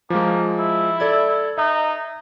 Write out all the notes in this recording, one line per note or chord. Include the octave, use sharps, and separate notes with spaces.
F3 G#3 A#3
E4
A4 D5 G#6
D#4 E5